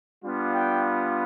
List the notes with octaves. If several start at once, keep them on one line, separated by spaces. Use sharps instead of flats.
G3 B3 D4 F4
G5